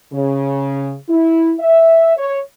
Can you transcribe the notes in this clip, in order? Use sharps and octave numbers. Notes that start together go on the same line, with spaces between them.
C#3
E4
E5
C#5